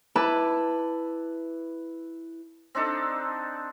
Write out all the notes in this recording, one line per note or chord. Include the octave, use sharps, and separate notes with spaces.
E4 B4 A5 D6
C4 D4 D#4 A4